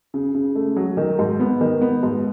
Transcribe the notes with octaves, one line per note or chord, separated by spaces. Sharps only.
C#3
C#3
A3
F#3
D#3
G#2
B3
D#3
B3
G#2